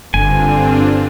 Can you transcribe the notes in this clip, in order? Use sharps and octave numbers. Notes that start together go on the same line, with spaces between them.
F#1 G2 D3 C4 D4 F4 G#5